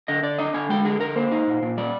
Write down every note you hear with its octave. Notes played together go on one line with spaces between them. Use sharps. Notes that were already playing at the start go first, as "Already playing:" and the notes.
D3 D#5
D3 D5
D4 D#5
D3 G#5
G#3 G5
D3 G#4
D3 A#4
A#3 C5
D#4
A#2
A#2
G3 D5